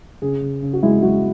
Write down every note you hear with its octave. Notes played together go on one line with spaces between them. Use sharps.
C#3 G#4
C#3
C#3
F#4
G#3 E4
G#3 F#4